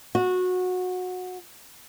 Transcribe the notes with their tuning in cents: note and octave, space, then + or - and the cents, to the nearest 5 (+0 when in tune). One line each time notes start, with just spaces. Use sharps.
F#4 -20